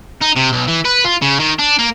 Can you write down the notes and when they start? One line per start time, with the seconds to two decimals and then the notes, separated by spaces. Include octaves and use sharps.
0.21 D#4
0.36 C3
0.52 B1
0.67 E3
0.85 B4
1.04 F4
1.22 C#3
1.40 D#3
1.59 D4
1.79 A#3